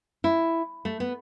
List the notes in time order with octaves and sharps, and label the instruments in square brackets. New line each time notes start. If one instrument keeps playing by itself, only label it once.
[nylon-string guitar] E4
A3
B3